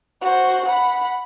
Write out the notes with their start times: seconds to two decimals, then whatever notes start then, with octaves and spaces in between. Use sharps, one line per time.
0.22 F#4 C5
0.66 F#5 B5